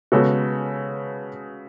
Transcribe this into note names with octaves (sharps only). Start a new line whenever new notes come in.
C#3 G#3 B3 F#4 A4